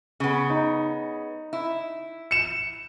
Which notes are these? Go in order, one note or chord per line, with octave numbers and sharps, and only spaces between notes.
C#3 B3
D#4
E4
C#7 E7